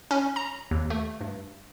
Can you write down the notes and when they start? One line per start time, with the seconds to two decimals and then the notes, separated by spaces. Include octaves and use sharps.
0.11 C#4
0.36 A#5
0.71 D#2
0.90 A3
1.21 G2